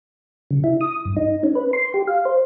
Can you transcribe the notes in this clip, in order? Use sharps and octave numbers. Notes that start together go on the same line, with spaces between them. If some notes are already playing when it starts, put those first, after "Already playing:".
C#3
E4
D#6
G2
D#4
C#4
B4
C6
G4
F5
C5